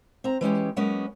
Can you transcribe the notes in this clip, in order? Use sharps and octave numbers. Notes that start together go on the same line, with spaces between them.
C4 A#5
E3 G#3 C#4 G4
F#3 G#3 A#3 B3 C#4